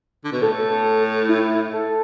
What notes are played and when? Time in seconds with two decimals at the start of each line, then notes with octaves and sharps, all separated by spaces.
0.24 D3
0.32 B2
0.42 A2 A4
1.29 E4
1.73 A4